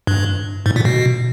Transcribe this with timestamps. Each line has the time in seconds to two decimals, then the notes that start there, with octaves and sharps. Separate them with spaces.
0.07 G2
0.66 G#2
0.76 A#2
0.85 B2